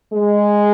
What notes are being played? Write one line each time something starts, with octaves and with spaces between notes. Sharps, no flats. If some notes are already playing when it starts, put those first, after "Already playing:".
G#3